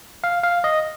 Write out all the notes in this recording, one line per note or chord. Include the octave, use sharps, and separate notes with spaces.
F5
F5
D#5